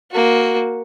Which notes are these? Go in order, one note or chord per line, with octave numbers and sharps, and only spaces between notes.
A#3 F#4